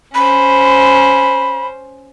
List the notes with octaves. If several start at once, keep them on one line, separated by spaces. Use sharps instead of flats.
C#4 C5 B5